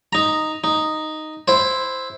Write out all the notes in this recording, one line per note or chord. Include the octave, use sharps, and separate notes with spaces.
D#4 A#5
D#4
E4 C5